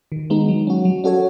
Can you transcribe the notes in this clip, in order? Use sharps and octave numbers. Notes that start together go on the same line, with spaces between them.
D#3
G#3 B3 D#4
F#3
C#4 F#4
F#3
C#4 F#4 A4 C#5